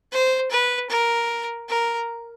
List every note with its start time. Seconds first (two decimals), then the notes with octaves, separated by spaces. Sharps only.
0.12 C5
0.51 B4
0.90 A#4
1.69 A#4